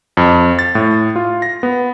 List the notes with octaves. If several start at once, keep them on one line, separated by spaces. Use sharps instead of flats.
F2
A6
A2
F4
A#6
B3